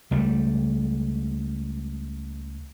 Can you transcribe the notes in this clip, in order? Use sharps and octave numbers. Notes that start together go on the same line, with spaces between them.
C#2 G3 A3